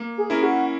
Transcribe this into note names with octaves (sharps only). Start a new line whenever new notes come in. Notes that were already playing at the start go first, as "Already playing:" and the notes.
Already playing: A#3
G#4
C#4 E4 A#4
F#4